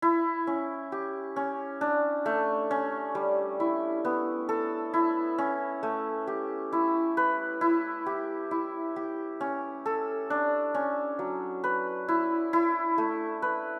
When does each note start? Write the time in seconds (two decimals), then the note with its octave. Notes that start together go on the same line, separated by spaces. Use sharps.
0.02 E4
0.47 C#4
0.92 G4
1.36 C#4
1.81 D4
2.26 A3
2.71 C#4
3.15 G3
3.60 E4
4.05 B3
4.49 A4
4.94 E4
5.38 C#4
5.83 A3
6.27 G4
6.73 E4
7.17 B4
7.61 E4
8.06 G4
8.51 E4
8.96 G4
9.41 C#4
9.86 A4
10.30 D4
10.74 C#4
11.19 F#3
11.64 B4
12.08 E4
12.53 E4
12.98 A3
13.42 B4